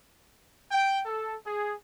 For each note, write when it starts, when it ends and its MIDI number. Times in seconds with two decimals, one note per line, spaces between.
0.71 1.00 79
1.06 1.35 69
1.46 1.73 68